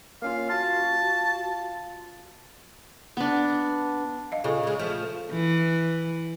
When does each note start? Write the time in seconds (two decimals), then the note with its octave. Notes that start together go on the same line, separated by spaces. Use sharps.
0.22 A#3 C#4 F4 F5
0.49 F4 F#4 A5
3.17 B3 D4
4.32 D#5 F5
4.44 C#3 F4 A4
4.63 C#3 G#3
4.79 F3 A3
5.32 E3